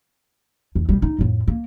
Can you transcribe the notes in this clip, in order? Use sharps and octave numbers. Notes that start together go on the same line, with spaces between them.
E2
B2 G3
D#4
F2 A2
A#3